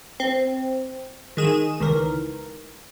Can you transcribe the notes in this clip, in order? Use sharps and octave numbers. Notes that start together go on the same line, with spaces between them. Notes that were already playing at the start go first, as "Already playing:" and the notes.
C4
D#3 G#3 G#4 D#7 E7
C#2 D#3 E3 A#4